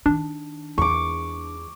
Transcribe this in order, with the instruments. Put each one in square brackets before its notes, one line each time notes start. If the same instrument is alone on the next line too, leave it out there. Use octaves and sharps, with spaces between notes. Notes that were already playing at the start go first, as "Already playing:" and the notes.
[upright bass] D#3 [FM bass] D4
[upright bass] E2 [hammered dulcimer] C#6 D6